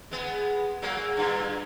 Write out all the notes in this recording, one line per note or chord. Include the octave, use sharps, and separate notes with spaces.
G#3 B3
F#3 G#3 A#3
G2 A#2